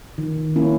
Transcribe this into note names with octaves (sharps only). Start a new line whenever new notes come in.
D#3
A#3 C#4 E4